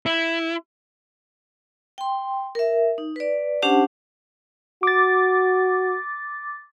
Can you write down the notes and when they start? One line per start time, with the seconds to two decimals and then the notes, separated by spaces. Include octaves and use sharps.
0.06 E4
1.98 G5 C6
2.55 A#4 E5
2.98 D#4
3.16 B4 D5
3.62 C#4 D4 G4 C5 F#5 A5
4.83 F#4 D6 A6